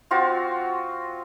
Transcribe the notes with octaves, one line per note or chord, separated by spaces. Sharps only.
C4 F4 F#4